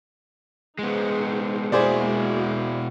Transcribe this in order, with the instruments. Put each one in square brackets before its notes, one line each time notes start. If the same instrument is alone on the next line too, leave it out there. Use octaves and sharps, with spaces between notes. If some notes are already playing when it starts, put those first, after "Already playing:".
[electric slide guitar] G#3 B3 [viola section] D#4 G#4 C5
[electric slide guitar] B2 E4 [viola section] G#3 A#3 F#4 [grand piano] G#4 C5 D5